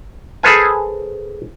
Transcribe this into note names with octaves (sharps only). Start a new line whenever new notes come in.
G#4 A4 B4 C5 F5 G#5